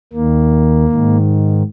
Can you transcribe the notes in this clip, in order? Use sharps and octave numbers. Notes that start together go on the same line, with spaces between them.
D#2 D#3 A#3
G#2 D#3